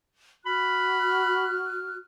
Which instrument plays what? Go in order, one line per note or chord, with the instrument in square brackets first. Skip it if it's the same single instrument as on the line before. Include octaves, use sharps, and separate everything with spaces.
[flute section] F#4 F6 F#6 [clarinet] B5